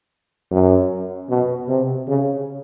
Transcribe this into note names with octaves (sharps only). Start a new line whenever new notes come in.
F#2
B2
C3
C#3